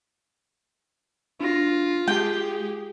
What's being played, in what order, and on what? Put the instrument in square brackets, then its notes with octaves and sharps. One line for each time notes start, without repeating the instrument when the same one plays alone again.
[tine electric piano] D4 A#6 [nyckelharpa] F4
[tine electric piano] G#3 [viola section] G4 G#4 [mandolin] G5